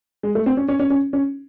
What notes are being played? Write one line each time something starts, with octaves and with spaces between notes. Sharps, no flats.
G#3
A3
C4
C#4
C#4
C#4
C#4
C#4